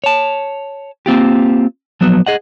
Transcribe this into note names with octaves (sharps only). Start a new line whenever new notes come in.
C#5 A5
A#3 C4 F4 G4
F3 F#3 B3
G#4 D#5 F#5